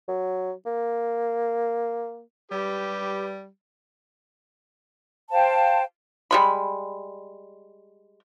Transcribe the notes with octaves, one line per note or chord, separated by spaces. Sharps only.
F#3
A#3
G3 G4 B4
C5 F5 G5 A5
G3 G#3 B5